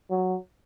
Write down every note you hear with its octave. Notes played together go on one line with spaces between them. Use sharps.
F#3